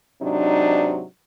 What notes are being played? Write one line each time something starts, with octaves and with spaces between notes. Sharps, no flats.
G#2 C3 F#3 D4 D#4